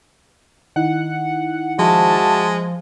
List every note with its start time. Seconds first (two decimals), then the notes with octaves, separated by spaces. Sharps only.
0.76 D#3 D#4 E4 F#5
1.79 F3 G#3 F#4 E5 A5